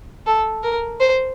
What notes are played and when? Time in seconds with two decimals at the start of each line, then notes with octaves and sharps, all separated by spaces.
0.26 A4
0.63 A#4
1.00 C5